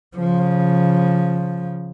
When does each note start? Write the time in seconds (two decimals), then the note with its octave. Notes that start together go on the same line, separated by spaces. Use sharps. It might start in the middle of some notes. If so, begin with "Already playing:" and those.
0.17 C#3 F3